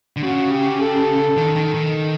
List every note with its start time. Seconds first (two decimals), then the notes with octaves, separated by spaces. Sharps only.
0.17 D3
0.23 C#3 F#4
0.52 G4
0.81 A4
1.37 D#3
1.56 D#3
1.75 D#3